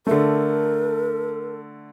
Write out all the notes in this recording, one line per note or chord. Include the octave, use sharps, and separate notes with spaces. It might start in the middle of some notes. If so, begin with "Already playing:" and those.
D3 A3 A#4